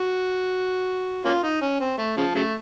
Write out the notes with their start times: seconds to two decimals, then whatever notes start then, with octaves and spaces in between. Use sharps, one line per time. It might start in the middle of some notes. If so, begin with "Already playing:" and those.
Already playing: F#4
1.25 A#3 C#4 F4
1.43 D#4
1.61 C#4
1.80 C4
1.98 A3
2.17 C#3 F3
2.35 C#3 F#3 A3